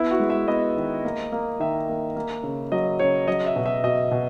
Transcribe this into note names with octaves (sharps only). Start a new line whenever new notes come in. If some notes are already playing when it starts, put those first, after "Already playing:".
Already playing: B3 E4
F#4
G#3
E5
B3 D#5
D#3
A#3
A#3
D#3 E5
A#3
A#3
C#3
F#3 D#5
C#3 C#5
F#3 D#5
E5
B2
E5
B2 D#5
B2